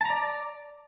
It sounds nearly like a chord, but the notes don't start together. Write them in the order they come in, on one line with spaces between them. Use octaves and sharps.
A5 A#5 D5